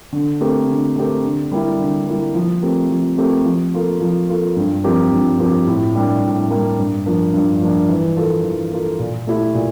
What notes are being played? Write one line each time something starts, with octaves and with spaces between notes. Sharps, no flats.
D3
A3 C4 G4 A#4
D3
A3 C4 G4 A#4
D3
G3 A#3 E4
D3
G3 A#3 E4
F3
A3 C4 G4 A#4
F3
A3 C4 G4 A#4
F3
A#3 F4 A4
F3
A#3 F4 A4
G2
F3 C4 G4 A#4
G2
F3 C4 G4 A#4
A2
G3 A#3 D4
A2
G3 A#3 D4
G2
F3 A#3 D4
G2
F3 A#3 D4
E3
A#3 F4 A4
E3
A#3 F4 A4
A#2
A3 E4 G4
A#2